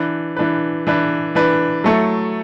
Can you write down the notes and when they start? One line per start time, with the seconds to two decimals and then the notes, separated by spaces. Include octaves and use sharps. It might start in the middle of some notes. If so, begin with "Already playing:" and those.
Already playing: E3 D4 B4
0.37 E3 D4 B4
0.87 E3 D4 B4
1.35 E3 D4 B4
1.84 F#3 A3 E4 A4